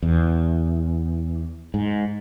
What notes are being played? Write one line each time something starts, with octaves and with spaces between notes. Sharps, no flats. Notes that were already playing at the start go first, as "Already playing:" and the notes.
E2
G#2